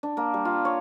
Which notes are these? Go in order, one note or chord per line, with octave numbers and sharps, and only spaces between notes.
D4
A#3
G3
F4
C#5